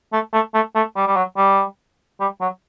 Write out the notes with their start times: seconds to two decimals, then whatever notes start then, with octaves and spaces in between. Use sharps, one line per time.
0.13 A3
0.33 A3
0.54 A3
0.76 A3
0.96 G3
1.07 G3
1.16 F#3
1.37 G3
2.21 G3
2.41 F#3